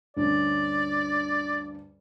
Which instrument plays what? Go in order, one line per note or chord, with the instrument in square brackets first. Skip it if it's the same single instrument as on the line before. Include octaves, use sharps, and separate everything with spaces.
[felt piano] D2 G2 C#4 [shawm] D5